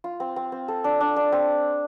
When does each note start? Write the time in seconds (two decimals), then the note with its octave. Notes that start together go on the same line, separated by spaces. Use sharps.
0.04 F4
0.20 C4
0.36 C4
0.52 C4
0.68 A4
0.84 D4
1.01 D4
1.16 D4
1.32 C4